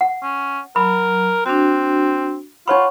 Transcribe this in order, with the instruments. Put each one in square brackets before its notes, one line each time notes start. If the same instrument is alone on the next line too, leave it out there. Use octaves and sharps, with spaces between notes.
[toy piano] F#5
[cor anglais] C#4
[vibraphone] F#3 [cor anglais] A#4 [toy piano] B5
[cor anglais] C4 [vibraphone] D4 F#4
[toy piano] D#4 C#5 B5 [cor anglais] F4 [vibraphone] F#5 C#6